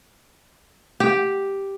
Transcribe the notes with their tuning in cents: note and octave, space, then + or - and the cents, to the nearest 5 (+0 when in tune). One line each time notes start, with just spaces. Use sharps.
G4 +0